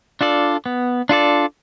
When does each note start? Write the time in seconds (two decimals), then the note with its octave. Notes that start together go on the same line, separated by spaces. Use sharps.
0.21 D4 F4 A4 D5
0.66 B3
1.09 D4 F4 A4 D5